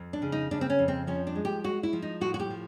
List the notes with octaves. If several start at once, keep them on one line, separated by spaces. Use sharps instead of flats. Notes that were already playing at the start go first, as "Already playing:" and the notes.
Already playing: F2
D4
C#3
D#4
C#3 D4
C4
C#4
F2
C4
F3 C#4
D4
G#3
G4
G#3 F#4
E4
F3
D#4
A2 F#4
F#4
G4
F3